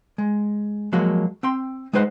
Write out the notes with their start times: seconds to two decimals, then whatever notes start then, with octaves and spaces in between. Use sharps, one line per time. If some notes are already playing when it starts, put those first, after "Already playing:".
0.18 G#3
0.92 F3 F#3 G#3 A#3 F#4
1.43 C4 G5 C6
1.93 G#3 D#4 B4 C5 F5 F#5